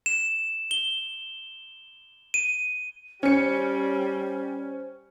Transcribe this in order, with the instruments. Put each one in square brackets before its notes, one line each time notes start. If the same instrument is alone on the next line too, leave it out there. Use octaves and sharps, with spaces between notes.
[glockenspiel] E7
G7
D#7
[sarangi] G3 [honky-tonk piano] C#4 C#7 [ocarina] C5 [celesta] G#5